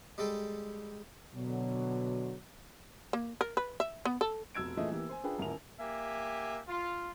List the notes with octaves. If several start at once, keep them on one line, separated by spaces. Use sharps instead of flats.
G3 G#3 A4 G5
B2 D3 F#3
A#3
A#4
B4
E5
B3
A4
F1 B2 E6 G#6 D7
A#2 E3 A3 G#4 D#5
E3 A#3 B3 G4
C5 G#5
D4 F4 G#4 B4 G5
D#1 A1 E4 A#4 G#5 F7
A#3 G4 E5 G#5
F4